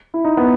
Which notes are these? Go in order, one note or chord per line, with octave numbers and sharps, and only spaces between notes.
E4
D#4
B3